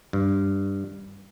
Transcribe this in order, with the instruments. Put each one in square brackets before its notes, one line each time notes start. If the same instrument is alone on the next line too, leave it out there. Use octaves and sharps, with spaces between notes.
[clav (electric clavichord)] G2